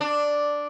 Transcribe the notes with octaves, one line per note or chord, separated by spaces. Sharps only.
D4